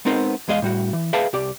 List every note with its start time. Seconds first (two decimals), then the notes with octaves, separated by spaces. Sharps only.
0.05 G#3 B3 C4 D#4 A#4 C5
0.48 E2 G#3 G#4 D#5 F5
0.62 A2 G3 F#4
0.93 E3
1.13 G#4 B4 E5 F5 G5 A5
1.33 C2 G4 D5